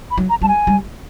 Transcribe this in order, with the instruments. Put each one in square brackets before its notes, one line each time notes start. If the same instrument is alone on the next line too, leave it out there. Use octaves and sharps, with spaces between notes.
[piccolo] B5
[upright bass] F#3
[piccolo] A#5
[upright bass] G3 [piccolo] A5
[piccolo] G#5
[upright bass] G3